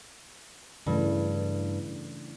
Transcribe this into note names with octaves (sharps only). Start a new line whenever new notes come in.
G2 C#3 E3 A3